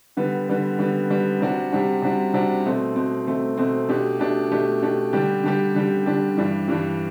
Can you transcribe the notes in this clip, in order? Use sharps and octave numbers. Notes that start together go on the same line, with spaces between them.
D3 G3 B3
D3 G3 B3
D3 G3 B3
D3 G3 B3
C3 G3 D4 F#4
C3 G3 D4 F#4
C3 G3 D4 F#4
C3 G3 D4 F#4
B2 A3 C4
B2 A3 C4
B2 A3 C4
B2 A3 C4
B2 A3 D4 G4
B2 A3 D4 G4
B2 A3 D4 G4
B2 A3 D4 G4
D3 G3 D4 G4
D3 G3 D4 G4
D3 G3 D4 G4
D3 G3 D4 G4
G2 E3 G3 D4
G2 E3 G3 D4